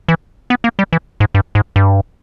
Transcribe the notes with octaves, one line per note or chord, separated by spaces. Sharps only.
E3
B3
A#3
G3
E3
G#2
G2
G#2
G2